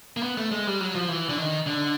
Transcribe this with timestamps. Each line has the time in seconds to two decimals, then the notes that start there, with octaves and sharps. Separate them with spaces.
0.17 A#3
0.23 B3
0.37 A3
0.51 G#3
0.67 G3
0.81 F#3
0.95 F3
1.09 E3
1.29 D3
1.38 D#3
1.67 D3